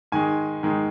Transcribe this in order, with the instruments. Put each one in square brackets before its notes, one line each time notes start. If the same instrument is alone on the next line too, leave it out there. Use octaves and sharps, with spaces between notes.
[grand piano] G#2 D#3 G#3 G#5
G#2 D#3 G#3